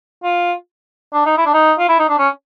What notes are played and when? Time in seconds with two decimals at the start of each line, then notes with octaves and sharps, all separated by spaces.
0.23 F4
1.13 D4
1.26 D#4
1.37 E4
1.46 D4
1.53 D#4
1.78 F4
1.88 E4
1.99 D#4
2.09 D4
2.18 C#4